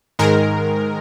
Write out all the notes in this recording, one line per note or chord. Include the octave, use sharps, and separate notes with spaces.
G#2 D#3 G#3 A#4